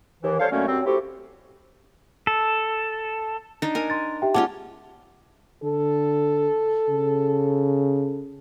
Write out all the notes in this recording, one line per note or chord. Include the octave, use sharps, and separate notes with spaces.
D#2 E3
G3 C#4 A4 C5 C#5 F5
F#2 D3 F#3 A3 A#3 C#4
F#2 F#3 G3 C4
A3 C4 E4 F#4 G4
A4
D4 D#4
A#4 G#5
C6 A6
G4 E5 G5
G#3 C#4 F4 F#5 A5 D6
D3 A4
C#3